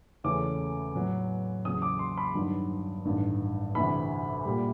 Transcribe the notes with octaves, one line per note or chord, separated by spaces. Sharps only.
E2 C#3 E3 A3 C#4 D6
A2 F#3 B3
E2 C#3 F#3 D#6
D6
C6
B5
G2 D#3 F#3
A1 G2 D#3
D2 C3 E3 B5
A#2 G3